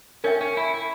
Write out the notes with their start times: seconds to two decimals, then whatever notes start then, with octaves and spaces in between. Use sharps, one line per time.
0.24 C#4 A#4 C#5 E5 G5
0.41 C#4
0.57 E4
0.74 E4